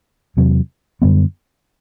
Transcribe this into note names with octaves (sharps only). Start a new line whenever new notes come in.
E2 C3 F#3
F#2 D3 G3 B3